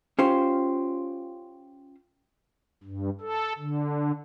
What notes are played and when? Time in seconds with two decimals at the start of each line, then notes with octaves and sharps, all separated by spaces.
0.19 C#4 F4 G4 C5
2.83 G2
3.21 A4
3.59 D3